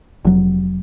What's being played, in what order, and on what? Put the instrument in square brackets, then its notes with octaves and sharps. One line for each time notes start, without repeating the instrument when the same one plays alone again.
[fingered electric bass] F1 F#3